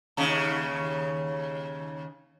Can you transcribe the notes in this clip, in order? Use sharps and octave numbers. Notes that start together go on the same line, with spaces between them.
D#2 C#3